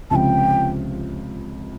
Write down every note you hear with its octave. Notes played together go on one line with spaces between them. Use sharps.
C#2 C3 F3 G5 A5